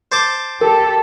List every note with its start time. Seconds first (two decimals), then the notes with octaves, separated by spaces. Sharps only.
0.12 C5 A5 D6
0.61 G4 A4 A#4